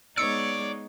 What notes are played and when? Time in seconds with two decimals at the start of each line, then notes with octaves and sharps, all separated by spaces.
0.17 G#3 B3 D#4 C#5 D5 E6 C#7